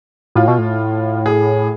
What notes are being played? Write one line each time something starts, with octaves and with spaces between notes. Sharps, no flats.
A2 F4
B2
A2
G#4